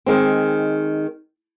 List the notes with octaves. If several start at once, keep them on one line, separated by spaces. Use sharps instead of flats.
D#3 G#3 C4